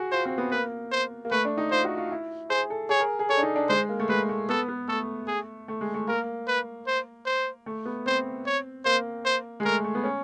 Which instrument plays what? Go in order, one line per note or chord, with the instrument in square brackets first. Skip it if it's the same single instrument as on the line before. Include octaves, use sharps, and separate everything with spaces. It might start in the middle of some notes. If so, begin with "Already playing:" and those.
Already playing: [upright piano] F#4 G#4
[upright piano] F4 [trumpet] C5
[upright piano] C4
B3
[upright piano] A#3 [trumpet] B4
[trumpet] C5
[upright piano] A#3
[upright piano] A3 [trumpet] B4
[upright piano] D4
D#4
[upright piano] F4 [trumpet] C5
[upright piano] F#4
F4
E4
[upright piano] G#4 [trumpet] C5
[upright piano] A4
[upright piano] G#4 [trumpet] C#5
[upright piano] A#4
G#4
[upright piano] A4 [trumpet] C#5
[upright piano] D4
D#4
D4
[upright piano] G#3 [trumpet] C5
[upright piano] A#3
A3
[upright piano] G#3 [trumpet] B4
[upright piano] A3
[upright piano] B3 [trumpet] A4
[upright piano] B3
[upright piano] A3 [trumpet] A4
[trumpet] G#4
[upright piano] A3
G#3
A3
[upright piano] A#3 [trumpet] A#4
[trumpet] B4
C5
C5
[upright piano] A3
B3
[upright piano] C4 [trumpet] C5
[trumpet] C#5
[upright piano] A#3 [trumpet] C5
[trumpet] C5
[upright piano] G#3
[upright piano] A3 [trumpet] A#4
[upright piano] A3
B3
C#4